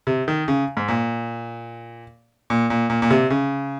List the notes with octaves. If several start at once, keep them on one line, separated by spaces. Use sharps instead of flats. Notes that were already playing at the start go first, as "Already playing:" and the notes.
C3
D#3
C#3
G#2
A#2
A#2
A#2
A#2
A#2
C3
C#3